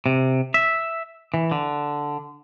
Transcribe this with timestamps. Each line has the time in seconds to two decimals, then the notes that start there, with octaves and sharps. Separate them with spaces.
0.06 C3
0.54 E5
1.34 E3
1.51 D3